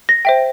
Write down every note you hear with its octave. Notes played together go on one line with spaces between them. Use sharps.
A#6
C5 E5 G5